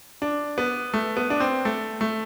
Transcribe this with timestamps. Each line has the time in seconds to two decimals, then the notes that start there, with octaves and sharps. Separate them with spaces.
0.22 D4
0.58 B3
0.94 A3
1.17 B3
1.30 D4
1.40 C4
1.65 A3
2.01 A3